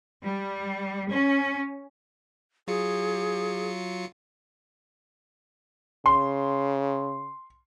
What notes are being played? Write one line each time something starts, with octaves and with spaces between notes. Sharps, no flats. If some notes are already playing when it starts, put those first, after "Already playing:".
G3
C#4
F#3 F4 G#4 C#7
C#3 C6